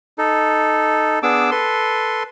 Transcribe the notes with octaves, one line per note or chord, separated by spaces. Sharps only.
D#4 A4
B3 D4 G#4 D6 E6
A4 B4 C6